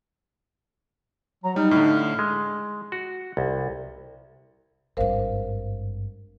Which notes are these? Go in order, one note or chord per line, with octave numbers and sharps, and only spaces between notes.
F#3 A#5
G3 D#4 F6
A2 D3 F6
G#3
F#4
C2
G#1 G2 A#4 C5 F5